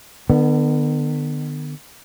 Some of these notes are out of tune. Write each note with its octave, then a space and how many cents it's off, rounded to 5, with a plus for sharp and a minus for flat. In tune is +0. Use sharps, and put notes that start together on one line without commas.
D3 +40 B3 +0